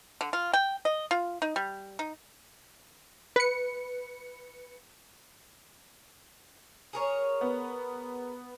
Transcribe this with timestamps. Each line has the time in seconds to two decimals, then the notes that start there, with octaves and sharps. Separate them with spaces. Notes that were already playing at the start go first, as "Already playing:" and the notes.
0.21 D3
0.33 F4
0.53 G5
0.85 D#5
1.11 F4
1.42 D#4
1.56 G3
1.99 D#4
3.36 B4 C#7
6.93 G#4 A#4 C#5
7.41 B3